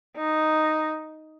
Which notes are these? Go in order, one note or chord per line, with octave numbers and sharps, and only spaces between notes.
D#4